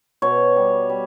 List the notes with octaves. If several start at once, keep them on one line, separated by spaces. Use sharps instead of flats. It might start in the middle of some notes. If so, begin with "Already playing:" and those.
B2 C#5
G3
G3